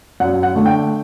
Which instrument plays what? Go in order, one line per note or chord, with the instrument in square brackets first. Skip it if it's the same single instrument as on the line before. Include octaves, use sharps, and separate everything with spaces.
[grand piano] F#2 F#5
F#5
D3 A3 D4
G5